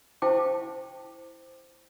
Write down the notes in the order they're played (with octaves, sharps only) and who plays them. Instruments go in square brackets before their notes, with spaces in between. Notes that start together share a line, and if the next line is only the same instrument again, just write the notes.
[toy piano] E4 C5 F5 G5 A5 D6